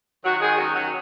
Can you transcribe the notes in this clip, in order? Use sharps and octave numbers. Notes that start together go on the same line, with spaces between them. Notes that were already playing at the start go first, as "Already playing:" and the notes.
D#3 F#3 F#4
D#3 G#3 G#4
F#3 C#4 F#4
D#3 F#3 F#4